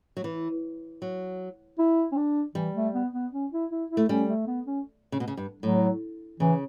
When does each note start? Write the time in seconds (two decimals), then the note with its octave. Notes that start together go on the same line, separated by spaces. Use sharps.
0.17 F#3
0.24 E3
1.02 F#3
1.78 E4
2.12 C#4
2.17 D4
2.55 E3 G3
2.75 A3
2.94 B3
3.13 B3
3.33 C#4
3.52 E4
3.71 E4
3.90 E4
3.97 A3
4.09 G3 C#4
4.29 A3
4.47 B3
4.67 C#4
5.12 C#3
5.20 B2
5.28 C#3
5.37 G2
5.63 A2 F#3
6.40 C#3 E3